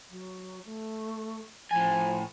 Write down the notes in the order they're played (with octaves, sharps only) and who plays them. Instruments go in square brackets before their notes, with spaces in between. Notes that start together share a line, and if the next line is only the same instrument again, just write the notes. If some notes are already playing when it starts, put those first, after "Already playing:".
[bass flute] F#3
A3
[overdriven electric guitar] A2 G#5 [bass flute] F3